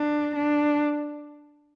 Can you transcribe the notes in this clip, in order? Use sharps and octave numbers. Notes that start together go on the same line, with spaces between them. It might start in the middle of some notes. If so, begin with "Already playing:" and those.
Already playing: D4
D4